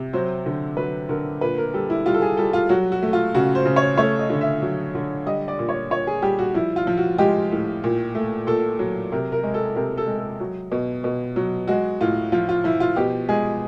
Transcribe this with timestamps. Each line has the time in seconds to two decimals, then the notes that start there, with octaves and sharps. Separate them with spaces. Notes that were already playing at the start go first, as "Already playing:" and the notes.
Already playing: C3
0.13 F#3 C5
0.46 D3
0.77 F#3 B4
1.09 D3 A#4
1.41 A#2 B4
1.58 A#4
1.74 G3 A4
1.90 E4
2.06 G3 F4
2.14 A4
2.22 G#4
2.37 G3 A4
2.53 F4
2.69 F#3 F#4
2.92 F#4
3.02 A3
3.13 F4
3.34 C#3 F#4
3.55 C5
3.65 C#3
3.76 C#5
3.98 A3 C#5
4.19 D#5
4.30 D3
4.41 E5
4.62 F#3
4.95 D3
5.26 G3 D#5
5.48 D5
5.59 A#2
5.69 C#5
5.90 A#2 C#5
6.07 G#4
6.22 G3 G4
6.39 F#4
6.54 F3 E4
6.76 F4
6.87 F3
6.97 F#4
7.18 G#3 G4
7.52 A2
7.84 A#2
8.15 A3
8.47 A#2 A4
8.79 F#3
9.12 C3 A#4
9.32 A#4
9.43 G#3
9.54 A4
9.75 C3 A#4
9.97 A4
10.07 G#3
10.18 A4
10.40 F#3
10.72 B2
11.04 B2
11.36 F#3
11.68 G#3 F#4
12.01 A2 F4
12.32 F3 F4
12.49 F4
12.64 F3 E4
12.80 F4
12.96 B2 G4
13.29 G#3 G#4